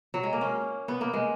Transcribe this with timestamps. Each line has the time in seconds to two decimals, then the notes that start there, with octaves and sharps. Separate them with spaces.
0.14 F#3
0.23 G#3
0.33 A#3
0.41 C#4
0.88 B3
1.01 A#3
1.13 G#3